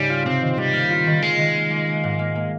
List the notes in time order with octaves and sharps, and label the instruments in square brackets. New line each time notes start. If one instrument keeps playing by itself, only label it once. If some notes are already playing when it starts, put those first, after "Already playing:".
Already playing: [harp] G#2 C#3 D#4 [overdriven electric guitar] G3
[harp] F4
[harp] C3 [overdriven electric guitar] C4
[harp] D#3
[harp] C3 [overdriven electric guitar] G3
[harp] A#3
F4
D#3
[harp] D#3 [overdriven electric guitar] G#3
[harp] D#3
A#3
A#3
A#3
G#2
A#3
A#3